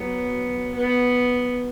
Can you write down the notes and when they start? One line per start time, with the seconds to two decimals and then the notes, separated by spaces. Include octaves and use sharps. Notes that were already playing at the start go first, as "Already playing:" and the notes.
Already playing: F#3 B3
0.74 B3